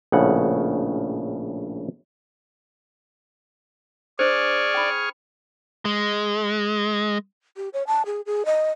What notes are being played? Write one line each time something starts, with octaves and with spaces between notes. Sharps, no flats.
A#1 A2 C#3 F#5
D4 G#4 C5 D5 C#6 F6
G5 B5
G#3
G4
C#5
A5
G#4
G#4
D#5